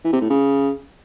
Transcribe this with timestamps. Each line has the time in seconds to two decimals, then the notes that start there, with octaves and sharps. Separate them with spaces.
0.05 E3
0.13 C3
0.22 A2
0.30 C#3